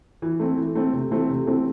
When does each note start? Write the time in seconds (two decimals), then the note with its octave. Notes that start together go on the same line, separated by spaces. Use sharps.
0.22 E3
0.40 A3 C4
0.57 E3
0.75 A3 C4
0.93 C3
1.11 E3 A3 C4
1.29 C3
1.46 E3 A3 C4